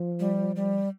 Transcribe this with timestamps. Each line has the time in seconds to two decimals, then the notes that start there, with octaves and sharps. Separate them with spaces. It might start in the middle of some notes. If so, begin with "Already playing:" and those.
Already playing: F3
0.20 G3
0.56 G3